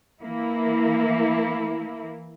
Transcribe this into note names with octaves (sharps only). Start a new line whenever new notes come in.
E3 A#3 E4